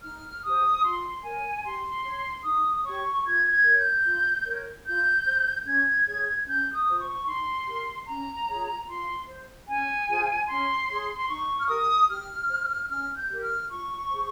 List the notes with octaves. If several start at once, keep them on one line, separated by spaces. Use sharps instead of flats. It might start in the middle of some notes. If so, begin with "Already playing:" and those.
D#4 F6
G4 C5 D#6
F4 C6
A#4 C#5 G#5
G4 C6
C#5
D#4 D#6
G4 C#5 C#6
F4 G#6
G#6
A#4 C#5
G6
F4
A#4 C#5
F4 G6
C5
C#4 G#6
G#4 C#5
C#4 G6
D#6
F4 C5
C#6
D#4 C6
G4 A#4
C#4 A#5
F4 G#4 C#5
F4 C6
C5
C#4 G#5
F4 G#4 C5
C#4 C6
G#4 C#5
C6
D#4 C#6
F6
G4 A#4 D#6
G4 F6
C5
C#4 F6
G6
G4 A#4
F6
F4 C#6
G#4 C5